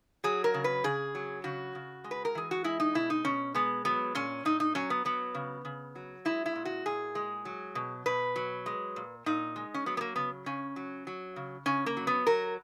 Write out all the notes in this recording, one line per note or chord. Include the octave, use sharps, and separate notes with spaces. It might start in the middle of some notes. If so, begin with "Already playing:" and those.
F#3 G#4
A#4
C#3
B4
C#3 G#4
F#3
C#3 F#4
C#3
G#3
B4
A#4
E3 G#4
F#4
G#3 E4
D#4
B2 E4
D#4
B2 C#4
G#3 B3
F#3 B3
A#2 C#4
A#2 D#4
D#4
F#3 C#4
B3
F#3 B3
C#3
C#3
F#3
G#3 E4
E4
A#2
F#4
A#2 G#4
G#3
F#3
B2
B2 B4
F#3
G#3
A#2
A#2 D#4
G#3
C#4
F#3 B3
B3
A#3
C#3 B3
C#3 C#4
F#3
F#3
C#3
C#3 C#4
A#3
F#3
B3
F#3 A#4